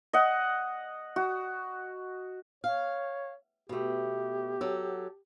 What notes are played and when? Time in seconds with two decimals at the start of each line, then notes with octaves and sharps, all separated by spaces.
0.13 D#5 F#5
1.16 F#4
2.64 C#5 F5
3.69 B2 A3 G4
4.61 F#3 A4